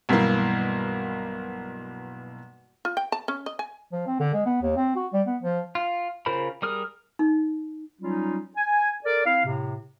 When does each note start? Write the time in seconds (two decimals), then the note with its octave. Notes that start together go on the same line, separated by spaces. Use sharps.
0.09 B1 G2 E3 A#3
2.85 F4
2.97 G5
3.12 A5
3.28 C#4
3.46 D#5
3.59 G#5
3.92 F3
4.07 C4
4.20 D3
4.34 G#3
4.46 B3
4.62 D#2
4.77 C4
4.96 F#4
5.13 G3
5.27 B3
5.43 F3
5.75 F4
6.26 C#3 F4 A#4 C5 B5
6.62 G3 G#4 A#4 D#6 F6
7.19 D#4
8.01 F#3 G3 C#4 D#4 F4
8.57 G#5
9.05 A4 A#4 D5
9.25 C4 E4 F5
9.45 A2 C3